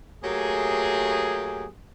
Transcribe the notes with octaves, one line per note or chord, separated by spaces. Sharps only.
F#3 A3 A#3 G4 G#4